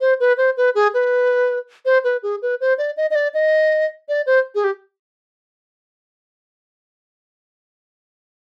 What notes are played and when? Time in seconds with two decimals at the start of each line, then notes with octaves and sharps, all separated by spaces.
0.01 C5
0.20 B4
0.37 C5
0.57 B4
0.75 G#4
0.94 B4
1.85 C5
2.04 B4
2.23 G#4
2.42 B4
2.61 C5
2.78 D5
2.97 D#5
3.11 D#5
3.15 D5
3.34 D#5
4.09 D5
4.26 C5
4.55 G#4
4.64 G4